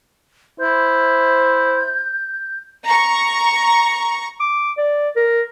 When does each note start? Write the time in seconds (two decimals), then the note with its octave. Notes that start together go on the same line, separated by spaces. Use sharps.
0.60 E4 C5 G6
2.86 A#5 C#6
4.40 D6
4.78 D5
5.16 A#4